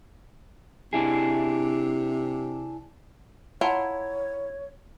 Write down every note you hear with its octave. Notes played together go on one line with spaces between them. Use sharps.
C3 D4 E4 G#4
E4 F4 C#5 F#5 A5 A#5